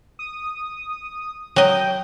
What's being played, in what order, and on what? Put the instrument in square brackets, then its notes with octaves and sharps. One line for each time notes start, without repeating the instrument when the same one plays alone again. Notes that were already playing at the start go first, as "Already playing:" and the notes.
[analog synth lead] D#6
[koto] F#3 D#5 [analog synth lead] G5